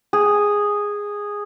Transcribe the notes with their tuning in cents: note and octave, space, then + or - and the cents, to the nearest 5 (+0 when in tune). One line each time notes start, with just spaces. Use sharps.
G#4 -10